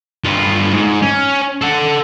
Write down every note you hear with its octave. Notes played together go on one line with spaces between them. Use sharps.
G2 F4
G#2
C#4
A4 F#5